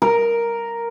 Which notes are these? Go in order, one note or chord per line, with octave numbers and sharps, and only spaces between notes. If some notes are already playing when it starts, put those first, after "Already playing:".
A#4